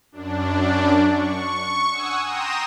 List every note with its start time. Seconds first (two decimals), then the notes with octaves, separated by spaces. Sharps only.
0.12 F#2 D4
1.14 C#6
1.90 F#5 G#5 D#6 E6
2.25 G5 A#5 C6 D#6 A#6 E7